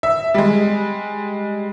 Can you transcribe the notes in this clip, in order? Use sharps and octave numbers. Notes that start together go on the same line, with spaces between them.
E5
G3 G#3